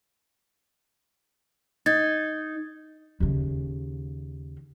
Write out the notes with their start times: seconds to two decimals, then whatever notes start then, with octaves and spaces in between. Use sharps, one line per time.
1.86 D#4 G#6 A6
3.20 D#2 C#3